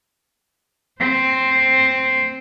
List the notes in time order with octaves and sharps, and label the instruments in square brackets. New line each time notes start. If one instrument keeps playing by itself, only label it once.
[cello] C4 C5